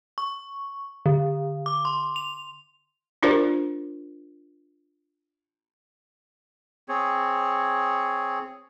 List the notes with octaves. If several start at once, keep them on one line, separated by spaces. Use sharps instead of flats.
C#6
D3
D6
C6
F7
D4 F4 G4 A#4 C5 D5
C4 G#4 C#5